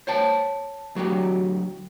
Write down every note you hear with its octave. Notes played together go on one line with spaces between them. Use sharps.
C5 C#5 G5 A5
D2 F#3 F#4 G4